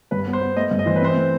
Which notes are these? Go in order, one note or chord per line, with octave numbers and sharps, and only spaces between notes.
G2 B4
B3
C5
B3
A3 D#5
G2
D#5
E3 C5
B4
C4 C5
A3